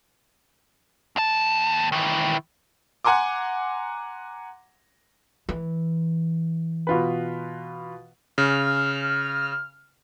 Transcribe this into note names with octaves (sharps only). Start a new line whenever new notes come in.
D#2 A5
D#3 E3
F#5 G#5 A#5 C6 D6
E3
B2 F4 B4
C#3 F6